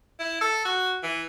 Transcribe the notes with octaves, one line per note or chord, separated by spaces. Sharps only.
E4
A4
F#4
E3